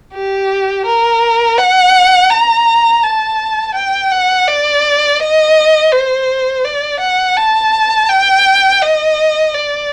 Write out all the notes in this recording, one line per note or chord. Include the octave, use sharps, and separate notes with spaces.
G4
A#4
F#5
A#5
A5
G5
F#5
D5
D#5
C5
D5
F#5
A5
G5
D#5
D5